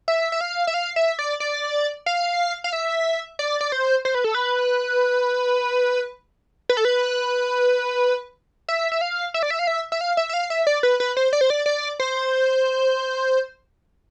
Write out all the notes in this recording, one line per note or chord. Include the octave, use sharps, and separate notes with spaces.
E5
E5
F5
E5
F5
E5
D5
D5
F5
F5
E5
D5
D5
C5
C5
B4
A4
B4
B4
A4
B4
E5
E5
F5
E5
D5
E5
F5
E5
E5
F5
E5
E5
F5
E5
D5
B4
B4
C5
D5
C5
D5
D5
C5